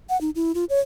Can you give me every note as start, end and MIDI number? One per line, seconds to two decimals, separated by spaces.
0.09 0.19 78
0.21 0.30 63
0.35 0.52 64
0.54 0.65 65
0.69 0.80 73